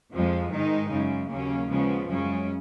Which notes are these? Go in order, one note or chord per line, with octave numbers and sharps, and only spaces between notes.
F2 F3 G#3
G#2 D#3 G#3 D#4
F#2 C#3 G#3
D#2 C#3 F#3 A#3 C#4
C#3 F3 G#3 B3
F#2 C#3 G#3 C#4